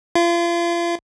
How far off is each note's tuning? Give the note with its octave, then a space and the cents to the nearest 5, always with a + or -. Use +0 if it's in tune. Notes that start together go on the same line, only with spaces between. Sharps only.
F4 -35